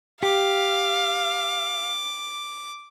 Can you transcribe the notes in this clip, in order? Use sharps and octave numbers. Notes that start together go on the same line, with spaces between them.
G4 F5 D6